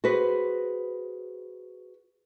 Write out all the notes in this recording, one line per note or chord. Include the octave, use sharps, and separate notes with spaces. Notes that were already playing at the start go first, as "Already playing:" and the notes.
F#4 G#4 B4 C5